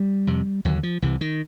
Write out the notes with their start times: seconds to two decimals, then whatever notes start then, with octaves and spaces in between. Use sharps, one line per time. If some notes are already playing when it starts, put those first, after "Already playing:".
Already playing: G3
0.27 F2 C3
0.65 D#2 D3 F#3
0.83 F3
1.02 C2 C3 E3
1.21 D#3